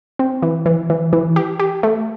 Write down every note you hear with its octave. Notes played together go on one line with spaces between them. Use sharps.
C4
E3
E3
E3
E3
G4
G4
A3